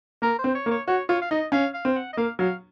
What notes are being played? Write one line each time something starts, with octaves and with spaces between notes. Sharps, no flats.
A#3 A#4
C5
C4
C#5
A#3
C#5
F#4 C#5
F4 C#5
F5
D#4 D#5
C#4 F5
F5
C4
F#5
D#5
A#3 F5
F#3 F5